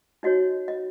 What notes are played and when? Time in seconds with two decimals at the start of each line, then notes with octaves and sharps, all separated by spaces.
0.23 D#4 F#4 C#5 D#5
0.68 D#5